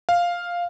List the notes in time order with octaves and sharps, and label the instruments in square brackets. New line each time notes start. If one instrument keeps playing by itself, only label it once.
[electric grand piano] F5